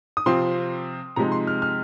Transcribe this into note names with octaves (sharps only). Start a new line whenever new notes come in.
D#6
C3 F3 C4 F4 C6
C3 F3 G#3 D#4 A#5
C6
F6
F6